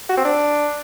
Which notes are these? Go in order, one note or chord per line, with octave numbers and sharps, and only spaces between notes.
F#4
C4
D4